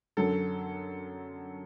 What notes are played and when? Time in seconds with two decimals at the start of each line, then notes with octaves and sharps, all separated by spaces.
0.17 F#2 D3 F#3 A4